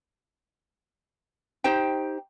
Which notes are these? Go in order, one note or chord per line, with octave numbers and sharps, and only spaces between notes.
D#4 G4 C5 G5